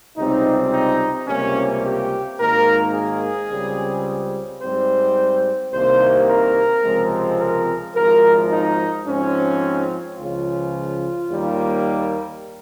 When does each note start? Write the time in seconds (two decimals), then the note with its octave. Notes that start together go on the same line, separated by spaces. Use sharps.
0.16 C#2 C3 G3 C4 D#4
0.72 D#4
1.27 C#2 C3 G3 A#3 C#4
1.84 G4
2.40 G#1 G#2 D#3 A#3 A#4
2.94 G#4
3.50 C#2 C#3 G3 C4
4.62 G#2 G3 C4 C5
5.73 C2 C3 D#3 A#3 C5
6.29 A#4
6.84 C#2 C3 F3 G#3 C4
7.40 A#4
7.95 G#1 G#2 F3 A#4
8.52 D#4
9.06 G#2 F3 C4 C#4
10.18 C#2 C#3 F3 F4
11.30 D#2 D#3 G3 A#3